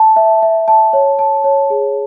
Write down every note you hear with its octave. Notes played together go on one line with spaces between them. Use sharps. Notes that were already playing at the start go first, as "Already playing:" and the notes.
Already playing: A5
E5
E5
A5
C#5
A5
C#5
G#4